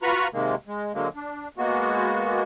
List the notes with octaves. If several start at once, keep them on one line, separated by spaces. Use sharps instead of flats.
F4 F#4 B4 A#5 B5 C#6
C3 D#3 G#3 A#3
G#3
D3 F#3 G#3 A#3
D4
G#3 A#3 B3 F#4